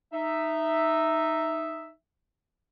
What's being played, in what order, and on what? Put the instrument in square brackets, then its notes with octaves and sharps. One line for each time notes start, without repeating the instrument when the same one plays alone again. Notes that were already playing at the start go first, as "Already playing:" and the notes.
[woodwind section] D#4 E5